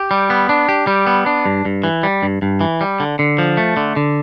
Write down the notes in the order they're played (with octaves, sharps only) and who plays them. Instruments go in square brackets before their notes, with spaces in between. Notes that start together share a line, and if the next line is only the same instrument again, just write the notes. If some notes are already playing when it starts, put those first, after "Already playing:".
Already playing: [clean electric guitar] G4
G3
B3
D4
G4
G3
B3
D4
G2
G2
E3
G3
G2
G2
E3
G3
D3
D3
F3
A3
D3
D3